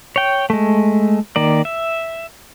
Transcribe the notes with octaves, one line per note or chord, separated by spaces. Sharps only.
C#5 G5
G#3 A3
D#3 A#3 D5
E5